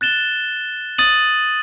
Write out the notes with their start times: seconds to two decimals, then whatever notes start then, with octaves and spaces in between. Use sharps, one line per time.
0.01 F#6 A6 E7 G7
0.98 D#6 A6 D#7 F#7